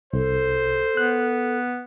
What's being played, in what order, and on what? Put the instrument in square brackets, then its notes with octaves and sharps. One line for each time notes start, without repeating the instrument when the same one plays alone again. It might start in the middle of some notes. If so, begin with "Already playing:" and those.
[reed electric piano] C2 [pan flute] A4 [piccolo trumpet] C5
[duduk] B3 [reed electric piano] F#6